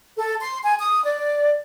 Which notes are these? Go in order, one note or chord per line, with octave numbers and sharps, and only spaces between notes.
A4
C6
G#5
D#6
D5